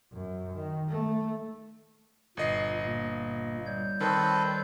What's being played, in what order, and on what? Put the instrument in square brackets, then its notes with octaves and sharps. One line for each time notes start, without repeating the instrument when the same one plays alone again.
[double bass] F#2
D#3
A3
[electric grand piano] G1 D#5 C7 [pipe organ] A#2
[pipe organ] A#2 A#3
G3 C#5 G6
[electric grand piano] D#3 [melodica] C4 A4 B4